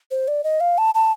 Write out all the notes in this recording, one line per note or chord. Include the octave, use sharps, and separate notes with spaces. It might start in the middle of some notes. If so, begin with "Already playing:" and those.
C5
D5
D#5
F5
A5
A5